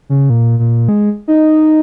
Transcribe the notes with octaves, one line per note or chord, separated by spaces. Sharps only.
C#3
A#2
A#2
G#3
D#4